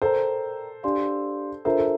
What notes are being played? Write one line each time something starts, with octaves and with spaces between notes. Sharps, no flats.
A4 A#4 C5 D5 G5 A#5
D4 G4 D5 F5 C6
D4 F4 A4 A#4 C5 E5 A#5
A4